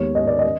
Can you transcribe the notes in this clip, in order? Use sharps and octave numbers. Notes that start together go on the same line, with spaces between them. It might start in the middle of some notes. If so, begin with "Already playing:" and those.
Already playing: D#2 D#3 G#3 B3 C#5
D#5
D5
D#5